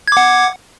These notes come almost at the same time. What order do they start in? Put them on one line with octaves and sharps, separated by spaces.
G#6 D6 F#5